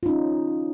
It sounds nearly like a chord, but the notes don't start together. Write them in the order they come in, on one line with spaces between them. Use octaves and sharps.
F4 D#4 C#4